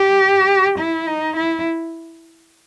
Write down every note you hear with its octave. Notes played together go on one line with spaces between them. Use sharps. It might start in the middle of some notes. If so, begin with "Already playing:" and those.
Already playing: G4
E4
D#4
E4